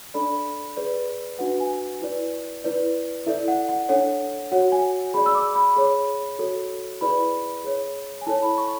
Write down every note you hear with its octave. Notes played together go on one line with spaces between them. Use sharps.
D4 A4 D5 B5
G#4 B4 D5
D4 F#4 B4 F#5
G#5
E4 B4 D5
E4 B4 D5
E4 A4 D5 E5
F#5
F#5
D4 A4 C#5 F#5
F#4 C#5 F#5
G#5
G#4 D5 B5
E6
D6
B5
G#4 C#5
F#4 A4 C#5
E4 G#4 B4 D5 B5
G#4 C#5
G#5
E4 A4 C#5 A5
B5
C#6